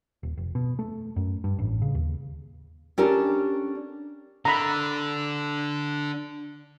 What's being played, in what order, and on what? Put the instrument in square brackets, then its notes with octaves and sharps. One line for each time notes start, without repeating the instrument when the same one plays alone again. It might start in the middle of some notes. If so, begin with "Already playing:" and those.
[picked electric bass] D#1
F1
B2
A3
F#2
G2
A1
C#3
D#2
[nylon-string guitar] C#4 D4 G4 A4 A#4
[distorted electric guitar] D3 [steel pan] A#5 B5